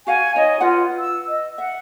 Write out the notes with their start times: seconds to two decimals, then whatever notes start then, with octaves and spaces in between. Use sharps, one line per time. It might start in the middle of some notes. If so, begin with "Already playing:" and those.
0.07 F#4 F5 F#5 G#5
0.36 D#4 C#5 D#5
0.61 F4 B4 F#5
0.99 E6
1.28 D#5
1.58 E5 F#5